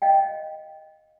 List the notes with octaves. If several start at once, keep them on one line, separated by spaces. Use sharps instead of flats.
D#5 F5 G5